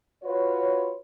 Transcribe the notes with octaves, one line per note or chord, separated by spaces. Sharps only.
F4 F#4 B4 C#5